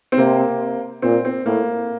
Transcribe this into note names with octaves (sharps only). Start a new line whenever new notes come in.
C4
C3 A#3
A#2 C4
C4
A2 A#3